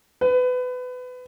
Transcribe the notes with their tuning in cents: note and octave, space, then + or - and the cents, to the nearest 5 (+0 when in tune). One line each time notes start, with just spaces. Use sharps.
B4 +25